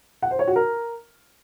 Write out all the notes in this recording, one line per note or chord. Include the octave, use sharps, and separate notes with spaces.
F#5
C5
C#5
F#4
A#4